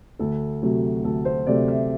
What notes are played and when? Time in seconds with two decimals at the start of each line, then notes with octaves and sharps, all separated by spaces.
0.19 D2 A4
0.62 C3 F#3 A3
1.04 D2 A4
1.25 C5
1.47 C3 F#3 A3 D5
1.68 E5